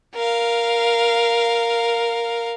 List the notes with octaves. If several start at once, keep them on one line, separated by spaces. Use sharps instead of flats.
A#4 F5